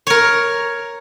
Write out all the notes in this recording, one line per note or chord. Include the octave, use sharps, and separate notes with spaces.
A#4 C#5